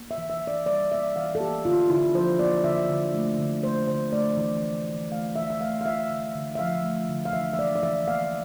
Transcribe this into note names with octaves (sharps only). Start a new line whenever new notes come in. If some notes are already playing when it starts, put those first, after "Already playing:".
Already playing: A#3
E5
E3
E5
E3
D5
G3 D5
A#3 E5
E3 F5
A4
A#3 G4
D3 F4
D3 E4
F3 C5
A#3 D5
D3 E5
D3
A3
D3
A3 C5
D3 C5
A3 D5
E3
A3
E3
A3 F5
E3 E5
E5
A3 F5
F5
A3 E5
D3
D3
E5
F3 F5
A3
D3
F5
E3 E5
E5
A#3 D5
D5
E3 E5
A#3 F5